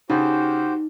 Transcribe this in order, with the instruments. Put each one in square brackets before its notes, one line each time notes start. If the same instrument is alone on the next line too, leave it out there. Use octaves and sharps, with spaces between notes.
[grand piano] C#3 [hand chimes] D#4 [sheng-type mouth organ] F#4 G4 C5